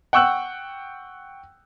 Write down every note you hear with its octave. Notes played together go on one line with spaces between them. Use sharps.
F#5 G5 C#6 E6 F#6